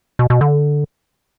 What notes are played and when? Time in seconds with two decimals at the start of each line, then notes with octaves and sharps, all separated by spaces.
0.19 B2
0.30 B2
0.41 D3